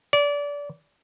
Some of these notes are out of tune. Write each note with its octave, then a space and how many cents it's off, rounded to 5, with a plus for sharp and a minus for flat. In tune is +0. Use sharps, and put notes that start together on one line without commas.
D5 -25